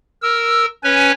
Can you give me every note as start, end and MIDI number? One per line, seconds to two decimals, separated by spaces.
0.23 0.66 70
0.23 0.66 88
0.84 1.12 61
0.84 1.12 71
0.84 1.12 73
0.84 1.12 80